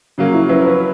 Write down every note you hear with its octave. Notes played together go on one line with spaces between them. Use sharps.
C#3 F#3 A#3 C#4
E4
F#3 C#4 E4 B4
B4